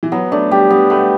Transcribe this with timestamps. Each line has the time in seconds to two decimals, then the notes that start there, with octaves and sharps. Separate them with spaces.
0.03 E3
0.12 F#3 B3
0.31 A3 D4
0.51 G3 G4
0.70 G3 B3
0.90 A3 B3